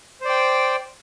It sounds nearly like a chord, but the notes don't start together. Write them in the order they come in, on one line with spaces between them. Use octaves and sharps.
C5 D5 G5